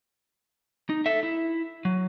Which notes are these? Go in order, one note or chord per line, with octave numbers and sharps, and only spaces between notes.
D#4
A4 E5
E4
F#3